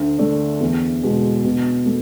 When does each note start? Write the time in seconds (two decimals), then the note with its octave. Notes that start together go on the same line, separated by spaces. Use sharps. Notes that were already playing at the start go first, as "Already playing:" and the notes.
Already playing: D2
0.19 D3 A3 D4
0.60 E2
1.03 B2 G#3
1.44 B2
1.86 A3